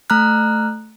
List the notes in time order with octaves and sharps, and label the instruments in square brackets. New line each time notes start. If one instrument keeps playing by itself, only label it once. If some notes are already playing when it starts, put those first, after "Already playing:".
[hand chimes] A3 A#5 F6 F#6